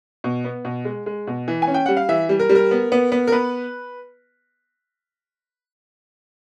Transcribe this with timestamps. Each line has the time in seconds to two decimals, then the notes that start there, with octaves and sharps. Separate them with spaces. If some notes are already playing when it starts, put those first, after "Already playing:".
0.24 B2
0.44 B3
0.65 B2
0.85 G#3
1.06 G#3
1.27 B2
1.48 E3
1.62 G#5
1.67 C#4
1.74 G5
1.86 G3 F#5
1.97 F5
2.09 E3 E5
2.29 G3
2.39 A#4
2.49 G3
2.55 A#4
2.71 B3
2.92 B3
3.12 B3
3.27 A#4
3.32 B3 B4